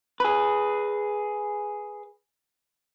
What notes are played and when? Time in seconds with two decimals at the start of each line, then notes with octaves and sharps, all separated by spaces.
0.20 G#4 B4